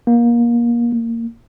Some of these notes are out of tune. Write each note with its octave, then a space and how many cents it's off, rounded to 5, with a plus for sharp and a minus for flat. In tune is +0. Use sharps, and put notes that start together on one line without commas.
A#3 +25
A#3 -20